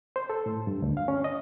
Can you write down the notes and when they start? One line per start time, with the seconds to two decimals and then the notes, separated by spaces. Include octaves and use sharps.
0.16 C5
0.30 A4
0.46 A2
0.67 G2
0.82 D2
0.97 F5
1.08 C#4
1.24 D#5